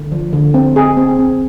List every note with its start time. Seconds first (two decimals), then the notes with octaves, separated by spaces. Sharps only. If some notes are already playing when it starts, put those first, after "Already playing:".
Already playing: D3
0.12 F3
0.33 D3
0.54 C4
0.76 G#4
0.97 C4
1.19 C4